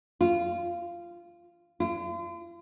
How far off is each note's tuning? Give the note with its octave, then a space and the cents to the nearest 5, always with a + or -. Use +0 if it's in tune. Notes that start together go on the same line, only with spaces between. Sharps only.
F4 -15
F4 -40